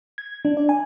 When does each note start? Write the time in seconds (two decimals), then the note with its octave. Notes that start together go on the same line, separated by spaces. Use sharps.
0.18 G#6
0.45 D4
0.57 D5
0.69 G#5